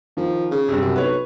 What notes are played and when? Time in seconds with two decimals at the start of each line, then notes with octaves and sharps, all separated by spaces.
0.17 D#3 F3
0.51 C#3
0.68 G2 C3
0.82 F#2
0.96 B1 B4 C#5